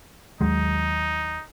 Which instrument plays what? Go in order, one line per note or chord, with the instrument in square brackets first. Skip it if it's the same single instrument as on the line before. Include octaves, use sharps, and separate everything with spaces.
[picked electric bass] D#2 F#3 G#3 [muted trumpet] D#4